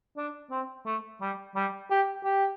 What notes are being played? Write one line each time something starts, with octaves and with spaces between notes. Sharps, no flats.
D4
C4
A3
G3
G3
G4
G4